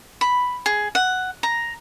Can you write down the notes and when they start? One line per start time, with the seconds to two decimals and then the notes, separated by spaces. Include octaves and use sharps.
0.21 B5
0.66 G#4
0.95 F#5
1.43 A#5